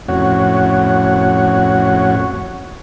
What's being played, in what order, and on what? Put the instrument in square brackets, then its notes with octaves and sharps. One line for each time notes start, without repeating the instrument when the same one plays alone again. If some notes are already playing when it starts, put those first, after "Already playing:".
[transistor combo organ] F2 A2 C#4 F#4 C#5 F#5